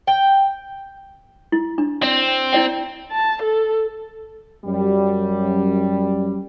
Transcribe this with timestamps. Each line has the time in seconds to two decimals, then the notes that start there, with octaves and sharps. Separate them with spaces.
0.07 G5
1.52 E4
1.78 D4
2.03 C4 D5
2.53 E4 D5 G5
3.12 A5
3.43 A4
4.65 F#2 G3